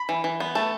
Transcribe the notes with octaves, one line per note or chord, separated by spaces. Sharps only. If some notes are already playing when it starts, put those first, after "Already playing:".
Already playing: B5
E3
E3
B3
A3 A5